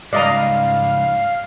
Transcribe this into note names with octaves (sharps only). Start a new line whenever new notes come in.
C#2 G#2 G3 D5 D#5 F5 A#5